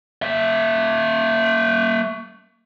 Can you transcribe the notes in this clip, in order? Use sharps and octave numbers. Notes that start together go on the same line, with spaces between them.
A#3 E5